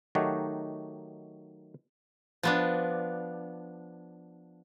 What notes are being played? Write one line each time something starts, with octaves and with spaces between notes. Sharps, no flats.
D#3 F#3 A3 D#4 F#4 G4
F3 B3 D4